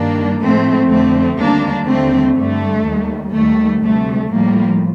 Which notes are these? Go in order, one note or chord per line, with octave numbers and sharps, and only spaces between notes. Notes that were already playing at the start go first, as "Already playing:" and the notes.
Already playing: G2 D#3 G3 A#3 D4
A2 F3 A3 C4
F2 D3 F3 A3 C4
D#2 D3 G3 A#3 D4
D#2 D3 G3 A3 C4
G2 D3 G3 A3
D#2 D#3 G3
D#2 D#3 G3 A3
D2 C3 G3 A3
A2 F3 G3 A#3